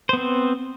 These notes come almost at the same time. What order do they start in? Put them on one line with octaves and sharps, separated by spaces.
C5 B3 C4